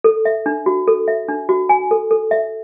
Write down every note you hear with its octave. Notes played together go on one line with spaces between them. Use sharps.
A4
E5
D4
F#4
A4
E5
D4
F#4
G#5
A4
A4
E5